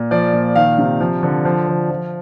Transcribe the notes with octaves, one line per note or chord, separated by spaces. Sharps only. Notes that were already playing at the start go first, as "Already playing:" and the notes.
Already playing: A#2
F3 D5
A#2
D#3 F5
C3
F3
D3
F3
D3
F3